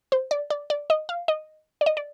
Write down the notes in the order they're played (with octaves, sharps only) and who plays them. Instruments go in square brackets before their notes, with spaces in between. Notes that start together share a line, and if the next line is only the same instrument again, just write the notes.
[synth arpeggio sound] C5
D5
D5
D5
D#5
F5
D#5
D5
D#5
D5